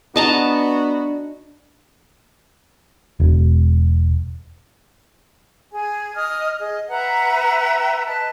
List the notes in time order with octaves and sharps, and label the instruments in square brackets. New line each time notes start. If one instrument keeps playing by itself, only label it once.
[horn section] B3 F#4 [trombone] D4 [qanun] D#5 A5 A#5
[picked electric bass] E1
[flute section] G#4 G#5
D#5 D#6 F6
G#4 D#5
B4 E5 F#5 A#5
B4 D#5 A5